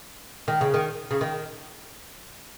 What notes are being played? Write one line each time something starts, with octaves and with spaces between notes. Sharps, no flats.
D#3
C#3
D#3
C#3
D#3